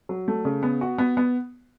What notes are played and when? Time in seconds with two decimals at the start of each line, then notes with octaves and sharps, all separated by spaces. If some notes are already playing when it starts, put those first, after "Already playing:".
0.09 F#3
0.28 A3
0.45 C#3
0.63 B3
0.81 F#4
0.98 B3
1.17 B3